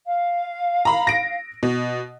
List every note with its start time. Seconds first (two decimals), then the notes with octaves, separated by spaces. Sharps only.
0.06 F5
0.85 A#5 B5
1.07 A#6 D7
1.63 B2